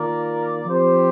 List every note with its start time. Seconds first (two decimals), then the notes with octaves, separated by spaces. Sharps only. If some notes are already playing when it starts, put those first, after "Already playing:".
Already playing: D#3 A#3 F4 A#4 D5
0.65 F3 C4 G4 C5